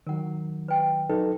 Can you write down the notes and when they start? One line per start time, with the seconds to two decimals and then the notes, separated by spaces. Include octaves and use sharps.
0.07 D#3 F#3 A#4 F#5
0.68 B4 G5
1.10 F#3 D#4 A4 B4